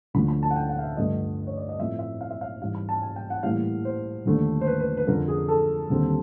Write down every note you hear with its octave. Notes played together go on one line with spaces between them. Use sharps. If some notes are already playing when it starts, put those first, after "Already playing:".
D2 D3 F3 A3 B5
B5
A5
F#5
G5
F#5
F5
E5
G2 D3 F3 A3 D4 D#5
C#5
D5
D#5
A2 F3 A3 C4 E5
E5
F5
E5
F5
G#2 E3 G3 F5
B5
A5
G#5
G5
F#5
A2 E3 G3 A#3 F5
C5
D#2 D3 F3 A3 D4
C5
B4
B4
B4
F2 D3 F3 A#4
G#4
A4
D#2 D3 G3 C4